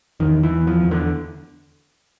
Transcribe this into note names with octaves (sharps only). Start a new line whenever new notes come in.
E2 D#3
E3
E2
F3
E2
D3